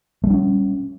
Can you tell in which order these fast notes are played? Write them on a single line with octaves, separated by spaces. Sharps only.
A3 G3 D4 C#4